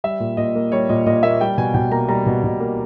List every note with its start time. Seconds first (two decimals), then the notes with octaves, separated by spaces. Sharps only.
0.04 G3 E5
0.20 A#2
0.37 A#2 D#5
0.55 A#3
0.72 G3 C#5
0.89 A#2 D#5
1.06 A#2 D#5
1.23 A#3 E5
1.41 G3 G5
1.58 B2 G#5
1.74 B2 G5
1.91 A#3 A#5
2.08 G3 A#5
2.26 B2
2.44 B2
2.60 A#3